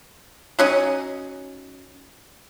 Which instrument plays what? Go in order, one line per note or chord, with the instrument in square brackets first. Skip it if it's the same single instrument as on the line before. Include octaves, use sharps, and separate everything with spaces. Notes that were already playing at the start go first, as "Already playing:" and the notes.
[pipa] F#3 C#4 D#4